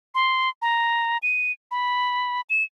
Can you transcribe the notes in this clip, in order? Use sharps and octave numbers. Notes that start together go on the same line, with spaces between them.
C6
A#5
D#7
B5
E7